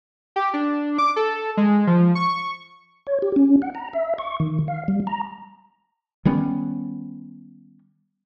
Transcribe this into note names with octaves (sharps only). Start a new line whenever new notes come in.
G4
D4
D6
A4
G#3
F3
C#6
C#5
G4
C#4
F#5
A#5
E5
C#6
D#3
F5
G3
A#5
D#3 G3 B3 C#4